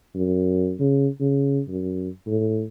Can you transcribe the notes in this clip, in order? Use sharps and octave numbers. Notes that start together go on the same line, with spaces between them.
F#2
C#3
C#3
F#2
A2